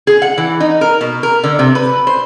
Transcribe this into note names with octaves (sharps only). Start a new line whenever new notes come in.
G#4
F#5
E3
D#4
A#4
B2
A#4
D3
C3
B4
C5